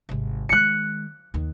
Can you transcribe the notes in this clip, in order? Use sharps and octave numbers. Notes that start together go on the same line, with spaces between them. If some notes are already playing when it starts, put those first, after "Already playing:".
G#1 C3
D#3 G#3 F#6 C#7
D#2 D#3